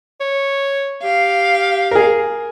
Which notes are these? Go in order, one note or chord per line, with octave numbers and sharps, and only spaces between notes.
C#5
G4 F5
G#4 A#4